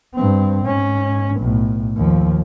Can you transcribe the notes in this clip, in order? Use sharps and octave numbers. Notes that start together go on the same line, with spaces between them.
G2 C4
G#2 C#4
B1 A2
D#2 F3